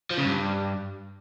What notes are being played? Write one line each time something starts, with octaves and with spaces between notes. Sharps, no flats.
F3
C#3
G2